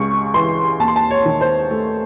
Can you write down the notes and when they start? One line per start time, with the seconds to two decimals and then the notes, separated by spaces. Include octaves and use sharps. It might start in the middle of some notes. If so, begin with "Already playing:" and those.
Already playing: C#2 C#3 C#6
0.34 E3 C6
0.80 D#2 A5
0.88 C6
0.96 A5
1.11 C#5
1.25 D#3
1.41 C5
1.71 A3